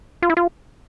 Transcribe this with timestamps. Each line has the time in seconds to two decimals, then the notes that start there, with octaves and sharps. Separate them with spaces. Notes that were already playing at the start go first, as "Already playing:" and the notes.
0.22 F4
0.30 E4
0.37 F4